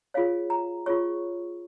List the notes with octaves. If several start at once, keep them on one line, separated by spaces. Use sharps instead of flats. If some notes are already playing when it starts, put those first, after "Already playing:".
F4 G#4 C#5 F5
A#5
F4 G#4 C#5 C#6